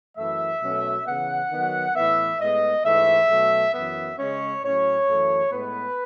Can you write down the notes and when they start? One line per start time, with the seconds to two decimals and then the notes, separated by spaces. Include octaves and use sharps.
0.17 F#2 E3 A3 E5
0.62 B2 F#3 A3 C#4
1.07 C#3 E3 B3 F#5
1.51 D#3 F#3 B3
1.96 A2 E3 B3 E5
2.40 A2 G#3 B3 D#5
2.84 G#2 E3 A3 E5
3.29 B2 F#3 A3
3.73 F#2 E3 B3 E5
4.18 C#3 G#3 C#4 C#5
4.62 A2 F#3 C#4 C#5
5.07 F#2 E3 A3
5.52 A2 G#3 B3 B4